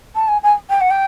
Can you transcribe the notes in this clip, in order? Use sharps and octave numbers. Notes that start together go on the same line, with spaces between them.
A5
G#5
G#5
G5
F#5
G5